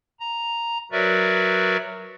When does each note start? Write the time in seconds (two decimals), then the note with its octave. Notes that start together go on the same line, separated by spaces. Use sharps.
0.20 A#5
0.92 F#3 F#4 A#4 B4 D5 E5